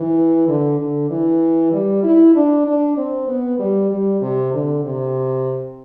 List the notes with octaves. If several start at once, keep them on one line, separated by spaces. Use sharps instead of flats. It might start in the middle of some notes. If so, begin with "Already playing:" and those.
Already playing: E3
D3
D3
E3
G3
E4
D4
D4
C4
B3
G3
G3
C3
D3
C3